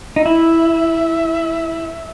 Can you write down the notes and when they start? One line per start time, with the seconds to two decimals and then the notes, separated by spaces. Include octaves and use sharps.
0.16 D#4
0.25 E4 E5